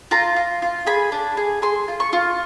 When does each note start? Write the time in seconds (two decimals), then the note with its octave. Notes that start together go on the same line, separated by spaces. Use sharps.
0.11 F4 A#5
0.36 F4
0.62 F4
0.86 G#4 B5
1.12 D4
1.37 G#4
1.62 G#4 C6
1.88 F4
2.00 C#6
2.13 F4